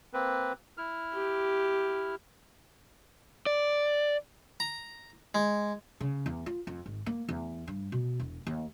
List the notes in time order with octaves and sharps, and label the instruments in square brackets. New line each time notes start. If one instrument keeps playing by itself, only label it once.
[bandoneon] A#3 C4 B4
E4 F6
[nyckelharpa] G4
[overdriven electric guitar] D5
[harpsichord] A#5
G#3
[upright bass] C#3
E2
F4
F2
G#1
A#3
E2
G2
B2
E1
D#2